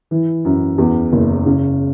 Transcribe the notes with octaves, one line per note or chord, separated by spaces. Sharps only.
E3
F#2
E2
F#1
C#3